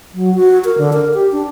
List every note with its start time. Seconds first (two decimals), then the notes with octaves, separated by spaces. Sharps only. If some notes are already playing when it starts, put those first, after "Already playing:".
0.14 F#3
0.35 F#4
0.65 A#4
0.78 D3
0.93 A#4
1.14 G4
1.32 D4